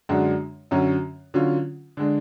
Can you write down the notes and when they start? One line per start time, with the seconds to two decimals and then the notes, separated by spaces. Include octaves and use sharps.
0.09 F#2 D3 G#3 D4 F#4
0.71 F#2 D3 F#3 C#4 F#4
1.34 D3 F#3 C#4 F4
1.97 D3 G#3 D4